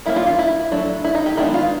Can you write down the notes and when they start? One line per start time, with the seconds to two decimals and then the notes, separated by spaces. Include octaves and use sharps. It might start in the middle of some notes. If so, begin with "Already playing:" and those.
0.06 D#3 G3 A#3 C#4 E4
0.16 F4
0.27 F4
0.39 E4
0.72 F#3 A3 D4
1.04 E4
1.15 D#4
1.26 G4
1.37 D#3 G#3 B3 D4 E4
1.54 F4